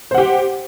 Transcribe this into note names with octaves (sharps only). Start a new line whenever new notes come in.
G4 C5 F#5